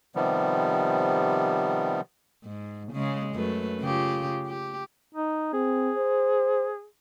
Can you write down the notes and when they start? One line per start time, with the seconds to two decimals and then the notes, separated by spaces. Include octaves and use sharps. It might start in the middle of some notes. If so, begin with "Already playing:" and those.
0.15 C3 D#3 F3 G3 B3
2.44 G#2
2.92 C#3 G#3
3.35 F#2 A3 B4
3.80 C#3 F4 G4
4.46 G4
5.15 D#4
5.53 C4 G#4
5.97 C5